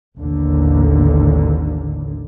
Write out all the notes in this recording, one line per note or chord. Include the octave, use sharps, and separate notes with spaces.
A1 D#2 D3